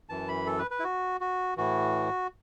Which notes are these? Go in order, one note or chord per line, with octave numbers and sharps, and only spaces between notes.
F#2 E3 A5
B5
A4
B4
B4
E4
F#4
F#4
A2 E3 F#4